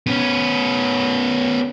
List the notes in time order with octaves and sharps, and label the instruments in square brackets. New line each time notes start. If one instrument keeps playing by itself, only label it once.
[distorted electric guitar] B3 C#4